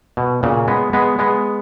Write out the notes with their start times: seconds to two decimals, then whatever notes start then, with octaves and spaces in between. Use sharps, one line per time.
0.17 B2
0.43 A#2 C#3
0.68 G#3 B3
0.93 G#3 B3
1.19 G#3 B3